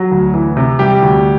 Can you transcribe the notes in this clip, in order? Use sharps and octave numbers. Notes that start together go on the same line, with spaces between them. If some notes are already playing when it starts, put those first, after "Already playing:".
Already playing: F#3
D2
E3
C3
G3 G4
D2